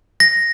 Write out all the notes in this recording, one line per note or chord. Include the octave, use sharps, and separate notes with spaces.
A#6